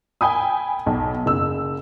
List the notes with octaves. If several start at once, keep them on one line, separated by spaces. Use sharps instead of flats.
G5 G#5 B5 D#6
B1
F#1 E6